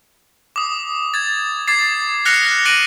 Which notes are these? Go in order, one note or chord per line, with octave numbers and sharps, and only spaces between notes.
D6 D#6
G#6 A6
D6 G#6 A6 C7
F6 F#6 A#6 C#7 F7
D6 F#6 A#6 D7 D#7 F#7